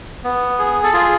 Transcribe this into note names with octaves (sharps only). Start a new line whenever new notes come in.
B3
G#4
A4
F4 G#4